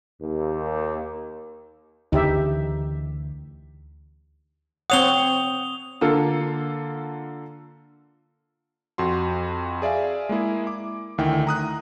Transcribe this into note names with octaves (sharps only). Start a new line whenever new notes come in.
D#2
D2 C#3 E3 D#4 G4 E5
C4 C#5 F#5 D#6 F7 G7
D3 A#3 F4 A4
F2 F#4 C6
G#4 D5 E5 F5 G#5
G#3 A#3 E4 G#4
D6
D2 D#3 E4 G5
A#5 D#6 F#6